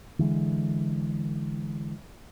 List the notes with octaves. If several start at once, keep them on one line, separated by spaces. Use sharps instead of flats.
D3 E3 G#3